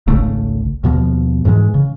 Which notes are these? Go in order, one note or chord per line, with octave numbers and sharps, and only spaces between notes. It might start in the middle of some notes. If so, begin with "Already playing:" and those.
G#1 C#2 C#3 A3
D#2 B2 F3
G#2 E3 F#3 G#3
C#3